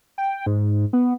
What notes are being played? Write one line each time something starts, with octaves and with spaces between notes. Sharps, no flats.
G5
G#2
B3